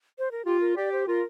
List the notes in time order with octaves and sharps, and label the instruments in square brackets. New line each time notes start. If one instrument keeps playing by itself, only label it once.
[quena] C5
A#4
[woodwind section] F4 [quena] G4
[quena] A#4
[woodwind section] G4 [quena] D5
[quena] C5
[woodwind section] F4 [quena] A#4